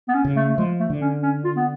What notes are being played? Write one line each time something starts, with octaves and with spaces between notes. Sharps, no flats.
B3
C#4
C#3
A3
A3
F3 G#3
A3
D3
C#4
C#4
F4
B3